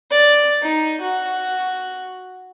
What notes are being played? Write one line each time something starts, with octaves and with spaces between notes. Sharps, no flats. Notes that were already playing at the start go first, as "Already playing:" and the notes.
D5
D#4
F#4